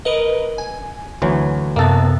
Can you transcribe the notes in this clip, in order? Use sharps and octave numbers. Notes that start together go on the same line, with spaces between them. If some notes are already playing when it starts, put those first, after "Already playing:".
A#4 B4 D#5
G#5
D2 E3 F#3
F#2 C3 A#3 B3 A4